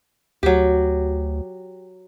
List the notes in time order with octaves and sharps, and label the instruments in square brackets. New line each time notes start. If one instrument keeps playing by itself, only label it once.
[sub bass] D2 [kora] F#3 G4